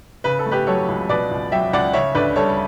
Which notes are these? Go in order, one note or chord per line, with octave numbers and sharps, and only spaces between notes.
C#3 B4
A4
A3
G4 B4
F#3 A4 C#5
C#2
B2 B4 D5
C#2
F#3 E5 G5
C#2 D5 F#5
C#3 C#5 E5
D2 B4 D5
G3 A4 C#5